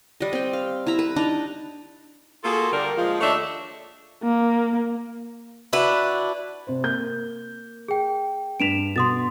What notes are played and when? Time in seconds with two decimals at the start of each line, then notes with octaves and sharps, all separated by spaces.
0.21 G3 D#5
0.33 C4 G5
0.53 F5
0.87 E4 E5 A#5 B5
0.99 B4
1.16 D4 D#4 D5 A#5
2.44 A#3 F4 F#4 G#4 A4
2.73 D3 G3 A#3 D4 A#4 D5
2.97 F3 G#3 F4
3.21 D#2 A3 D4 C#5 D#5 E5
4.24 A#3
5.73 D4 E4 F#4 B4
6.67 C3 C5
6.84 A#3 G6
7.88 G#4 G5
8.60 G2 B6 D7 E7 F7
8.96 B2 C6 D#6 A6